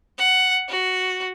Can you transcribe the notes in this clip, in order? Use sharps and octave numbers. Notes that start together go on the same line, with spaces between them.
F#5
F#4